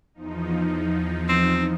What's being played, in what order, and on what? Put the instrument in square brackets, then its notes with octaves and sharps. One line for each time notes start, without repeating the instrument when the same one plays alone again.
[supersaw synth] E2 F3 D#4
[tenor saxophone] C4